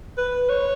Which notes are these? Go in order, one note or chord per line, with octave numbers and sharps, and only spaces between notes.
B4
C#5